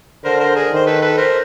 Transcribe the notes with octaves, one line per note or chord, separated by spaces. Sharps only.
D3 A#4 C5
A#4 C5
G#4 A#4
D#3 C5
A4 B4
A4 B4
A#4 C5